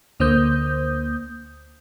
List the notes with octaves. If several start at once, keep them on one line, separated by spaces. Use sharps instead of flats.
D2 D3 A#3 C5 D#6 G6